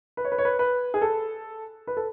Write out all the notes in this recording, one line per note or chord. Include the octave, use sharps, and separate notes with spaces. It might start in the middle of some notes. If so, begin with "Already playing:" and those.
B4
C#5
B4
C#5
B4
B4
G#4
A4
B4
A4